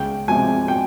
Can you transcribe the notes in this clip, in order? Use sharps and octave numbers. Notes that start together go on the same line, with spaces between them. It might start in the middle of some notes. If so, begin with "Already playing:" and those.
Already playing: C#2 G5
C3 F3 G#3 G#5
G5